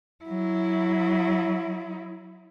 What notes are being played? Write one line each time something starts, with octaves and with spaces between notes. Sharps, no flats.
F#3 E4